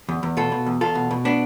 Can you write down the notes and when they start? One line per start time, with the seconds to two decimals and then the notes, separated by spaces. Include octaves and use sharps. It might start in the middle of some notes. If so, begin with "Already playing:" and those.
0.09 E2
0.23 E2
0.37 B2 F4 A4
0.52 B2
0.66 E2
0.81 E2 F4 A4
0.95 B2
1.11 B2
1.25 B3 D4